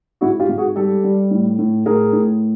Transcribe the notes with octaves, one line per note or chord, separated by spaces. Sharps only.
G#2 E4 F#4
F4 G4
G#2
F#4 G#4
G3 G4 A4
G3
A2
A2
A2 G#4 A#4
A2